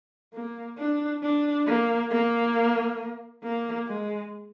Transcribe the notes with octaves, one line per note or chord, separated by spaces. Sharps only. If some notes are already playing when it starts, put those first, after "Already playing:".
A#3
D4
D4
A#3
A#3
A#3
G#3